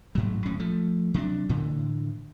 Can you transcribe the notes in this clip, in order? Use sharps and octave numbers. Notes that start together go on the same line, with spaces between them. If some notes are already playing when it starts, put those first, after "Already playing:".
A1 G#2 F#3
D1 A2 C#4
F3 A3
C3 F#3 C4 D4
A2 D3 E3